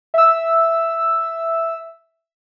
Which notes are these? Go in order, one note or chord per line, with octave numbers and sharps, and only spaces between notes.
E5 E6